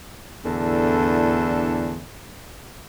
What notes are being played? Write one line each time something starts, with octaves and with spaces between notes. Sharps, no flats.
E2 A2 D3 D4 A4